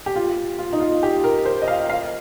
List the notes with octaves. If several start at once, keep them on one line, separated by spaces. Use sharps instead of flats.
G4
F4
F4
D#4
F4
G4
A#4
C5
D#5
F5
F5